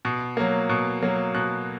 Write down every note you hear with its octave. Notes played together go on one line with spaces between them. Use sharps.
B2
F#3 A#3
B2
F#3 A#3
B2 F#6